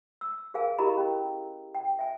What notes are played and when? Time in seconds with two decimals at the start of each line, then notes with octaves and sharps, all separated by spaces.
0.21 E6
0.54 G#4 A#4 F5 G#5
0.78 E4 G4 A#4 D#5 A#5 B5
0.97 C#4 A#4
1.75 G5
1.99 E5 G#5